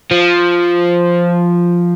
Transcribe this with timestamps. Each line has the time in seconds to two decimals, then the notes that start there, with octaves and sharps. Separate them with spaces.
0.11 F3